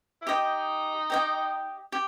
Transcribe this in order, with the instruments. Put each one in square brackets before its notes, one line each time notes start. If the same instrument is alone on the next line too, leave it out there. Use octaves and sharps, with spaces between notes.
[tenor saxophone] E4
[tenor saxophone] D#4 [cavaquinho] G4 D#5 G5
[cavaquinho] G4 D#5 G5
G4